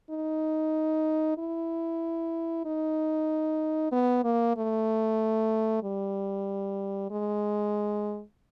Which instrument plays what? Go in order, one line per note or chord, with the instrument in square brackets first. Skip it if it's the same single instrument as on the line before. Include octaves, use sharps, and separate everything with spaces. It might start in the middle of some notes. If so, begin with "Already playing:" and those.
[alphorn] D#4
E4
D#4
B3
A#3
A3
G3
G#3